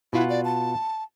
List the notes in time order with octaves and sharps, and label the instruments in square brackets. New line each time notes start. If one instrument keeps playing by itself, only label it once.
[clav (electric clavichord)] B2 F4 F#5 [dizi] E4
[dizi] D5
A5